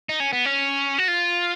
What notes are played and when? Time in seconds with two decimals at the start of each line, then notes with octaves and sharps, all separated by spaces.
0.09 D#4
0.20 C#4
0.33 B3
0.45 C#4
0.99 F#4
1.08 F4